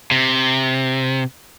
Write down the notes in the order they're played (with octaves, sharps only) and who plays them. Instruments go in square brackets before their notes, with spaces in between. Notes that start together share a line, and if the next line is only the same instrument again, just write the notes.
[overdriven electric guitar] C3